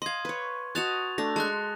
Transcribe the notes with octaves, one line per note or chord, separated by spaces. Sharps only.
D#5 F5 C6 G#6
B4 C#5
F#4 D#5 A5 F#6 A6 F7
A3 D4 A#6
G#3 A5 C6 C#6 F#6